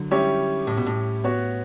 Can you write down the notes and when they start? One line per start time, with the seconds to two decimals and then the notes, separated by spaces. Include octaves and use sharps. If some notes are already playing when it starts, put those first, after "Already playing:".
Already playing: D3 F#3
0.11 G3 C#4 E4 G4 C#5
0.67 A2
0.77 B2
0.86 A2
1.24 B3 F#4 C#5